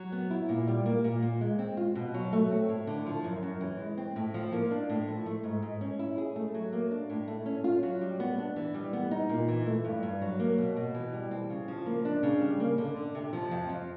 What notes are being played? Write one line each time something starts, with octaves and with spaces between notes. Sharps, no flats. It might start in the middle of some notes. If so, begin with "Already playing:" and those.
Already playing: F#3
B3
E4
A#2
G3
A#3
A#2
A#2
G#3
C4
F4
B2
F#3
A3
C4
A2
D3
F3
F#2
F#2
E3
G#3
C4
A2
F3
A#3
D4
A2
F3
A3
G#2
G#2
C#4
E4
G#4
A3
F#3
A#3
D4
A2
A3
C#4
F4
F#3
G3
B3
D4
E3
G3
B3
D#4
A#2
E3
A3
G2
G2
F#3
A#3
B2
B2
E3
G3
C4
C#3
F3
A#3
D4
C#3
G3
A#3
D3
D3
C3
F3
F2
F2